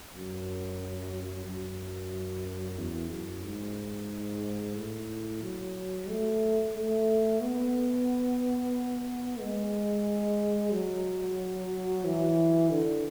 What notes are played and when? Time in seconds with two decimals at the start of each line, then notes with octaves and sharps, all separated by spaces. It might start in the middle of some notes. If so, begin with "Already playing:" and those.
0.13 F#2
1.45 F#2
2.78 E2
3.11 F#2
3.44 G#2
4.76 A2
5.42 F#3
6.09 A3
6.75 A3
7.42 B3
9.40 G#3
10.72 F#3
12.05 E3
12.71 D3